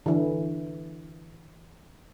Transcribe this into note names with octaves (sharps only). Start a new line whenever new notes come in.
D3 E3